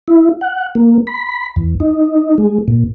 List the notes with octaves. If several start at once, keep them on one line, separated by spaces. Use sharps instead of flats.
E4
F#5
A#3
B5
E2
D#4
G#3
A#2